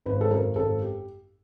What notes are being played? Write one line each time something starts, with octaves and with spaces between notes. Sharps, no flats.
G#1 B4
A4
F#2 A#4
G#1 A4
G4